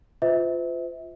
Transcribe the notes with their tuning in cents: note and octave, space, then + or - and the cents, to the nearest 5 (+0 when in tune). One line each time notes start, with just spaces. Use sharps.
F4 +0 C5 -45 E5 -35